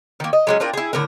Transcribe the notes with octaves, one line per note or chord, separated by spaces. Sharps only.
D#3 A#3
D#5
F#3 G#3 C#4
C4 D4 F4 A#4
E4 G#4
A2 D3 F#3 A#4